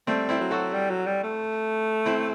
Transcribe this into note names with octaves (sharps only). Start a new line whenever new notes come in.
G3 A3 C4
C4 E4
F#3
F#4 A4
G3
F#3
G3
A3
C4 E4